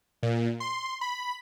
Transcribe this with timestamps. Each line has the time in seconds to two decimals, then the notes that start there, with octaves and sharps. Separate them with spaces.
0.23 A#2
0.60 C6
1.01 B5